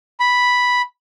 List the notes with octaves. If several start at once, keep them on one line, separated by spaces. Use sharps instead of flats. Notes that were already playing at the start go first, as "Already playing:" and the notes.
B5